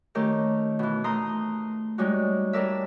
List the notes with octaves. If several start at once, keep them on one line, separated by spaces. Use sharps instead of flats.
D#3 A3 C#4 G4 A#4
B2 E3
A3 A#5 C6 D#6
G3 G#3 C#4 D#4 F#4
G3 C#4 A4 A#4 D5 E5